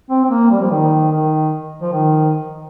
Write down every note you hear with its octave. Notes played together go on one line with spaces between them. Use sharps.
C4
C4
A#3
G3
F3
D#3
D#3
F3
D#3